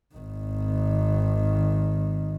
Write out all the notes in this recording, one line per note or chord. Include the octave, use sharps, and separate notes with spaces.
G#1 D#3